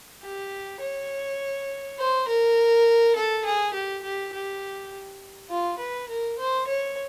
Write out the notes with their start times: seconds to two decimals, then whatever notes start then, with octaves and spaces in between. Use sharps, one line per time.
0.22 G4
0.80 C#5
1.98 C5
2.28 A#4
3.16 A4
3.45 G#4
3.73 G4
4.03 G4
4.32 G4
5.50 F4
5.79 B4
6.09 A#4
6.38 C5
6.67 C#5